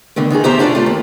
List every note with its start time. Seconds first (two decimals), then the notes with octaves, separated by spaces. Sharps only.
0.16 B2 D3 D#3 A3
0.30 D#3 E3 D#4 G#4
0.44 D2 B2 G4 C5 E5 A#5
0.59 C#4 D4 F4 A4 D5
0.75 A3 F4
0.86 D#2